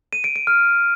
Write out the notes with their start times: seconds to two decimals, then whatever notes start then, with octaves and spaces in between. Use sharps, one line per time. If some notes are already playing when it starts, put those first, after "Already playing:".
0.13 D#7
0.24 D7
0.36 D7
0.47 F6